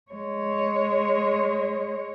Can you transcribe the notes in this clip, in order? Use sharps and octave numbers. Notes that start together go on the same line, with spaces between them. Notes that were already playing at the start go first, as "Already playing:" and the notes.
G#3 C#5